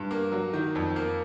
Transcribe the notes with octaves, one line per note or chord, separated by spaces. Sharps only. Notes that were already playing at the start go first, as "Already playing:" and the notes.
Already playing: G2
A#3
F#3
D#3
F2
A#3